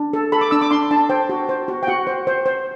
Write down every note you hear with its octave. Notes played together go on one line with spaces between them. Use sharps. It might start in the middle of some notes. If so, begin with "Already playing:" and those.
Already playing: D4
A4
A4 B5
D6
D4 E6
D6
D4 C6
D4 A5
C5 G5
F#4
C5
F#4
G5
F#4 F#5
C5
C5
C5